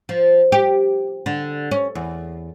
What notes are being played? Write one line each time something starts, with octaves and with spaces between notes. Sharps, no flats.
F3
G4
D3
C#4
E2